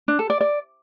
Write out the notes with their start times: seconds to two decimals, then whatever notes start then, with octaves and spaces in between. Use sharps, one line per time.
0.08 D4
0.19 A4
0.30 D5
0.41 D5